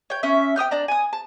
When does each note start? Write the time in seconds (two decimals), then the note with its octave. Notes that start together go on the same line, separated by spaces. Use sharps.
0.10 C#5 G5
0.23 C#4 E5
0.56 G5 D#6 F6 G6
0.71 D4 D5 A#5
0.88 G#5 D#6
1.13 A5